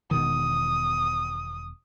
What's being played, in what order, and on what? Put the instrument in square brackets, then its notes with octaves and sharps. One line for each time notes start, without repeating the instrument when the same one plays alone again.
[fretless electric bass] E1 B2 D#3 [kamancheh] D#6